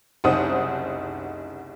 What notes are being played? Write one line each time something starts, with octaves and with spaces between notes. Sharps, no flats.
F#1 C2 D#4 C5 F#5 D#6